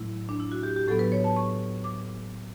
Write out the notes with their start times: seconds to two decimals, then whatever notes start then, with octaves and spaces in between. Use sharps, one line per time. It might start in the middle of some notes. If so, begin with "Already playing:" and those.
Already playing: A2 F#3 A3 E4
0.29 D4
0.40 E4
0.52 F#4
0.63 G4
0.76 G4
0.88 A2 F#3 B3 A4
0.99 B4
1.12 C#5
1.24 A5
1.36 C#6
1.84 D6